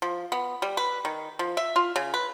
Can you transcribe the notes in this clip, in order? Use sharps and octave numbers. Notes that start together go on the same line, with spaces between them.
F3
B3
G3
B4
D#3
F3
E5
F4
C#3
B4